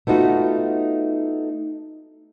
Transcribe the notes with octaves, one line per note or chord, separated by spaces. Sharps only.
A3 B3 D#4 F4 F#4